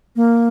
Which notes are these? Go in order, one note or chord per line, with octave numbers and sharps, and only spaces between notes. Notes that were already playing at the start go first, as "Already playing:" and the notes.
A#3